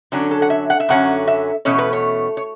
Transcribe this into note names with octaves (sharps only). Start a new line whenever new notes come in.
F#2 D3 F#3 C#4 D4
A4
F#5
E5
F#5
E5
F#2 D3 F#3 C#4 F#5
E5
E2 B2 A3 C#4 C#5
B4
C#5
C#5